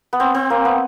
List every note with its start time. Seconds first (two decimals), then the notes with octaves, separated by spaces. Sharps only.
0.13 B3
0.20 C4
0.35 C4
0.50 A#3
0.65 B3